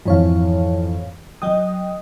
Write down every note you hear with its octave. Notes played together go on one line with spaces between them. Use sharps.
F2 G#2 E3 C#5 F5
F#3 D#5 G5 D#6